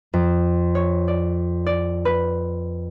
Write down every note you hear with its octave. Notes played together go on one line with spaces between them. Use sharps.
F2
C#5
D5
D5
B4